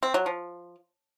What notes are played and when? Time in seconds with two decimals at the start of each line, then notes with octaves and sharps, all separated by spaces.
0.03 C4
0.14 F#3
0.26 F3